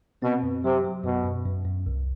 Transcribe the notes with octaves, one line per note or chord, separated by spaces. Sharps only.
B2 C4
F#2
C3 F#3
F#3
F#2 B2
F#2
F#2
F#2
C2